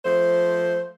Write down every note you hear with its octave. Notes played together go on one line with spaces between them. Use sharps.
F3 A3 C5